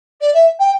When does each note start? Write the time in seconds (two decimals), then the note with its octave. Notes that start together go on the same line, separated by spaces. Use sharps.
0.21 D5
0.34 E5
0.59 G5